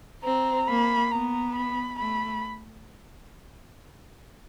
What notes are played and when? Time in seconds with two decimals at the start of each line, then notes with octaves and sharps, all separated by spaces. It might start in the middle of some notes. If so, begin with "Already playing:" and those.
0.24 C4 A#5
0.67 A#3 B5
1.11 B3 A#5
1.55 B5
1.99 A3 B5